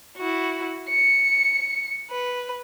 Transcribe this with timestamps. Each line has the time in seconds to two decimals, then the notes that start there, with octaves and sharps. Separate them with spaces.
0.17 E4 F#4
0.89 C#7
2.11 B4